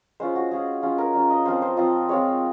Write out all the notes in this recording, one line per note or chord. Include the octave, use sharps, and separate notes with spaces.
G#3 C#4 F4 C5
F#4
G#3 C#4 F4 G#4
G#3 C#4 F4
A#4
G#3 C#4 F4
D#5
F3 C4 F4 C5
C5
F3 C4 F4 D#5
G#3 C4 F4 C#5